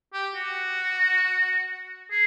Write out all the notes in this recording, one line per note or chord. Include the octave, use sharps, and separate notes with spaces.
G4
F#4
G#4